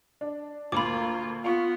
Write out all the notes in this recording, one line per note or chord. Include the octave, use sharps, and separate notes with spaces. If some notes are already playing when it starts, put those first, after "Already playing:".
D4
D2 A#2 A#3 F4 B5 D6
B3 F4 F5 C#6